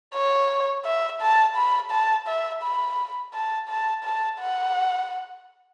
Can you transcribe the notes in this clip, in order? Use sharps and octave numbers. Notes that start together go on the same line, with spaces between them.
C#5
E5
A5
B5
A5
E5
B5
A5
A5
A5
F#5